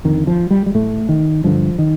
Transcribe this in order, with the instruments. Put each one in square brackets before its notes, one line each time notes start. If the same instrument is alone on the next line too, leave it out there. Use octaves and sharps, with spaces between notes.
[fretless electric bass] F2 D3 D#3
F3
G3
G3
A2 A3
D#3
G2 D3 F3
D#3